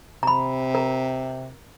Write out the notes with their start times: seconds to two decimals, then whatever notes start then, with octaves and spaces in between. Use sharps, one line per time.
0.23 C3 A#5 B5
0.75 A#4 A#5